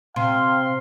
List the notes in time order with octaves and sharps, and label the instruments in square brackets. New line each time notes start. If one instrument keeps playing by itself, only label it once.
[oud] C3 [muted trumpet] F5 [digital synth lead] C6